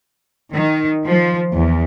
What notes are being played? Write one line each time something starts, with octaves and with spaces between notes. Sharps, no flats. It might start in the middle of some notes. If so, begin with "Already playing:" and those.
D#3
F3
E2